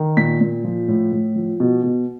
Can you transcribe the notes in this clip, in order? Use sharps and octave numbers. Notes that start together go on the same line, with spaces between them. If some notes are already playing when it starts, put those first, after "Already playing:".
Already playing: D#3
A#2 B6
A#2
F3
A2
A2
F3
B2
B2